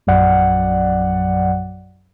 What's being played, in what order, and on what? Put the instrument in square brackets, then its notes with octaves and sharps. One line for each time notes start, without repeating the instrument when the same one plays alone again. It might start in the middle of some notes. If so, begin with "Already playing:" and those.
[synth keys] A#1 F#2 F#3 D5 F#5